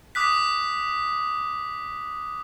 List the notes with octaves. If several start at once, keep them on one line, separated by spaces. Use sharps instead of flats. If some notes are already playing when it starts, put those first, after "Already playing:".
D6 D#6 F#6 B6